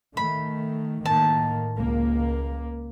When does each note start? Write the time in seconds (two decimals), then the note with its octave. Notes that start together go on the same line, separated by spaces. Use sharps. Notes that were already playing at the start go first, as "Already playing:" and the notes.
0.17 D#3 A3 B5
1.06 A2 D#3 A#3 A5
1.77 C#2 A#3